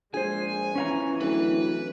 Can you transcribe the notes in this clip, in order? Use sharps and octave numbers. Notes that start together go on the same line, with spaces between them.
A#1 G#3 G#4 C5 G#5
E3 C#4 F5 A#5
D1 B4